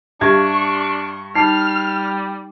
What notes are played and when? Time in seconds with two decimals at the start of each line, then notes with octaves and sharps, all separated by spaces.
0.21 G2 D4 E5 C#6 G#6
1.35 G3 D#4 F6 C7